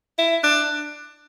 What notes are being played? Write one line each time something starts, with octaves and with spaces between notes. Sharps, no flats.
E4
D4